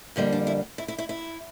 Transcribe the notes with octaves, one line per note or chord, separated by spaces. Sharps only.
F2 D3 G3 A#3 E4
D4
E4
E4
E4
E4
E4